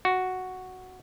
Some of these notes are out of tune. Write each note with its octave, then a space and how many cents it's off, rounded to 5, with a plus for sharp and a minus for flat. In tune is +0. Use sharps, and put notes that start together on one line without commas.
F#4 +0